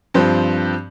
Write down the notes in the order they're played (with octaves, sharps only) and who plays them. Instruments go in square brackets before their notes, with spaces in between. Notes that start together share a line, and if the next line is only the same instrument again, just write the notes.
[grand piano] G2 F3 C4